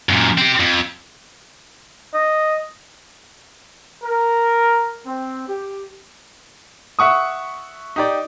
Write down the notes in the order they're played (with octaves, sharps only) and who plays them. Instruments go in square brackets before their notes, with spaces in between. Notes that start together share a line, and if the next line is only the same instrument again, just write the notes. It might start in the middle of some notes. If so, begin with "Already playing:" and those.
[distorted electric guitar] F#2 A#2
C4 G4
F2
[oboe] D#5
[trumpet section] A#4
C4
G4
[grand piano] E5 F#5 C#6 D#6
D#4 G4 D5